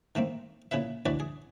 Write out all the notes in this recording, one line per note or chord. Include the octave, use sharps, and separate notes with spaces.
D#3 A3 A#3 C4
A#2 C#3 E4 B4 E5
D2 E3 D4 F#4 B4 D5
G#4